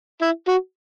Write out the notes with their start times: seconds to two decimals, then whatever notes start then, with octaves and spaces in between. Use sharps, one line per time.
0.22 E4
0.48 F#4